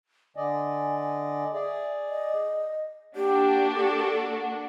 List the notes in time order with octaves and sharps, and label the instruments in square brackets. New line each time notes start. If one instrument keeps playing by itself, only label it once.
[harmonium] D3 D5 D#5 [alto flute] G#5
[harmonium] G#4 D5 [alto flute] E5
[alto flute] D#5
[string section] A#3 D4 F#4 [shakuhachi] G4
[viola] A4